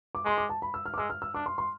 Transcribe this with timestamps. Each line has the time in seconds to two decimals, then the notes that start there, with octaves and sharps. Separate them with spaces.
0.15 D6
0.25 G#3 C6
0.38 D6
0.49 A5
0.62 B5
0.74 E6
0.86 F6
0.94 D6
0.98 G#3 E6
1.10 F6
1.22 E6
1.35 D4 D6
1.46 C6
1.58 C6